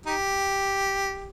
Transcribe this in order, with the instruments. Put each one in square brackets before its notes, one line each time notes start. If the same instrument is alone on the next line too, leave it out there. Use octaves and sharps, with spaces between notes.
[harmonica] D#4 G4